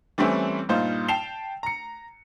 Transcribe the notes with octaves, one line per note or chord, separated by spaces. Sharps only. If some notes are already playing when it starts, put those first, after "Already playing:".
E3 G3 A3 C4 C#4 E4
G2 A#2 D#4 F4 C5
G5 A5 C7 E7 F7 G7
A#5 C#7